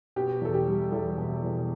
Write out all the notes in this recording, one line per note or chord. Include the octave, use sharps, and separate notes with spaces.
B2 G4
E2 A4
G4
G3
E2 A4
B2
E2